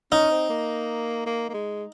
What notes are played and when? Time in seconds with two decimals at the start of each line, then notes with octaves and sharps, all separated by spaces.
0.12 C#4 D#4
0.31 C4
0.49 A#3
1.26 A#3
1.49 A#3
1.54 G#3